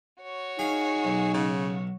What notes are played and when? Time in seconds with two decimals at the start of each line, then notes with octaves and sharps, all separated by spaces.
0.23 F#4 C#5
0.59 D#4 G#4 F5
1.05 B1
1.34 C#3